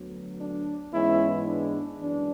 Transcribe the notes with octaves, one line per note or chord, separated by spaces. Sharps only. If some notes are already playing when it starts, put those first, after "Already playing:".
Already playing: D2 D3 F#3 B3
D4
G#2 E3 G#3 B3 C#4 E4
D4
F#2 E3 G#3 B3 D4